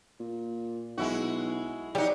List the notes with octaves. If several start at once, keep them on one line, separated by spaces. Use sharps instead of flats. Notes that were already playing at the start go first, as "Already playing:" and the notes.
A#2
B1 G#3 E4 F#4
F#3 G3 D#4 G4